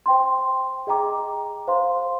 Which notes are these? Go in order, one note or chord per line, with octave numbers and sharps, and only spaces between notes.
C5 G5 C6
G#4 D#5 G5 A#5 D6
C5 F5 C6